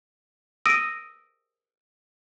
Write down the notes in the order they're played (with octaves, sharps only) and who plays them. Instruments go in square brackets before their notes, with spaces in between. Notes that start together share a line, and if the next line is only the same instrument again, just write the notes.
[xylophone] D#6 E6 A#6 D7 D#7